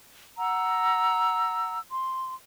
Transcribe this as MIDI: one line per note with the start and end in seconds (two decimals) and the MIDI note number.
0.39 1.79 78
0.39 1.79 82
0.39 1.79 88
1.91 2.35 84